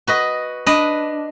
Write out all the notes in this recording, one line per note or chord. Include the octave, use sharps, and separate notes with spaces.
F#4 B4 D#5
D4 B4 D#5